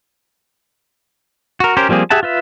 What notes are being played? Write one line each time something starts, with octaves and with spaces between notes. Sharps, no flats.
F#4 A#4
C#4 G4 A#4 C5
F3 G3 A#3 C4 G#4
G4 G#4 E5 F#5 A5
F4 B4 E5